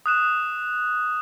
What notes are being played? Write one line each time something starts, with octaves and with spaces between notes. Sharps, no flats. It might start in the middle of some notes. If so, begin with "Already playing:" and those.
D#6 F#6 E7